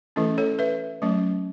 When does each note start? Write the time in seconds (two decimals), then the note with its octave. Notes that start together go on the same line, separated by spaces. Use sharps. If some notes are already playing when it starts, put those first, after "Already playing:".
0.16 E3 A3 C#4 E4 A4
0.38 A4 C#5
0.59 B4 E5
1.02 F#3 A3 C#4